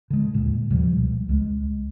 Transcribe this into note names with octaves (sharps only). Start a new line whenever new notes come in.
D3 G#3
D#2 A#2
B2 F3 G3
C#2
C#2 G#3